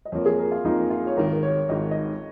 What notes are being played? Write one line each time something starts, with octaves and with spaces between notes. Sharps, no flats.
D#5
F2 F3 A#3 C#5
G#4
A#4
F4
F2 F3 A#3 D#4
F4
C#5
G#1 G#2 D#3 A#4
A#4
C#5
G#1 G#2 D#3 D#5
D#5